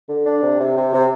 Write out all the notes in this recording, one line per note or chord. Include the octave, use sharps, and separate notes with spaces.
D3
D4
C3
C3
C3
C3